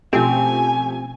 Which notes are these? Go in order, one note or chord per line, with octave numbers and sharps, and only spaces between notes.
B2 F3 A3 C4 C#4 G4 G#5